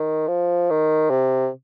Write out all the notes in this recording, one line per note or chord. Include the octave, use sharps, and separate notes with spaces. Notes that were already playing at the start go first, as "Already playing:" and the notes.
Already playing: D#3
F3
D#3
C3